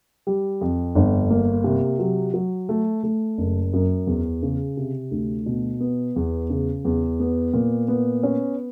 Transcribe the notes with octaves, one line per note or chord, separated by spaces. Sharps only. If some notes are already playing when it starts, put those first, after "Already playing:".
G3
F2
G1
A#3
C3
F#3
F#3
A3
A3
F#1
F#2
E2
C#3
C3
D2
B2
B3
E2
C#3
E2
B3
A#2
B3
C#4